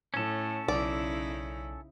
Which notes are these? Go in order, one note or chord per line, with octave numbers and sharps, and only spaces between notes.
A2 C#4 A4
B1 C#3 D#4 E4 D5